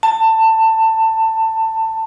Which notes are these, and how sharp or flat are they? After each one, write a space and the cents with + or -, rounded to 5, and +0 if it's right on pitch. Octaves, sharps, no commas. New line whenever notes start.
A5 +20